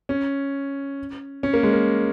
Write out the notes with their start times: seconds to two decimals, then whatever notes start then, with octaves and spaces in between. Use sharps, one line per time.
0.09 C#4
1.43 C#4
1.53 A#3
1.63 G#3
1.73 A#3